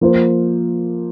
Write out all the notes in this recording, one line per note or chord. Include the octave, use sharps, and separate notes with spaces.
F3 A#3 F4 C5